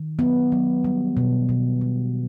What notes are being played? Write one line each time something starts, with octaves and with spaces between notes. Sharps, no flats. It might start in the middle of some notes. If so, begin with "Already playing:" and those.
Already playing: D#3
F#3 B3
F#3
G3
B2
B2
G3